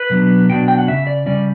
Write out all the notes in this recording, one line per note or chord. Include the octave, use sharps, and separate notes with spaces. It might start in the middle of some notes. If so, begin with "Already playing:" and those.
Already playing: B4
B2 F#3 B3 D4
B2 F#3 B3 D4 G5
G5
F#5
C#3 G3 C#4 E5
D5
C#3 G3 C#4 D5